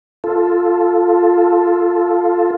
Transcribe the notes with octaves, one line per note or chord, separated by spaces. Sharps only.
F4 A4